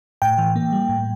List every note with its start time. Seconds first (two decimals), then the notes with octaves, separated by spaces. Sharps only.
0.22 A2 G5
0.38 E3
0.56 A#3
0.73 G3
0.89 A2